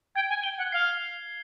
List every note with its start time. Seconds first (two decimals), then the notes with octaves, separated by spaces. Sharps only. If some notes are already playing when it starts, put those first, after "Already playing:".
0.15 G5 G#6
0.29 G#5
0.43 G5 G7
0.58 F#5
0.72 F5 C7